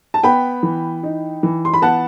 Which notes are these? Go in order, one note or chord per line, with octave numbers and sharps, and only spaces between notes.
A5
B3 G5 B5
E3
D#4
E3
C6
B5
B3 F#5 A5